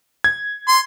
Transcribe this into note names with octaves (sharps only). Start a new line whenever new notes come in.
G#6
C6